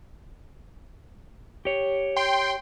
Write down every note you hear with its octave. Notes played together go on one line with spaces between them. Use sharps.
G4 C#5
G5 C6